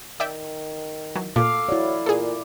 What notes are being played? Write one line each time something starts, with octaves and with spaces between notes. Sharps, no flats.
D#3 D5 E5 G5
E3 F#3
A#2 A4 F5 D6
F#3 E4 D5
A#2 G#4 A4